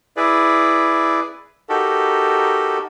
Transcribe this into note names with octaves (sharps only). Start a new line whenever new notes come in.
E4 G#4 B4 D5
D#4 F#4 G4 A4 A#4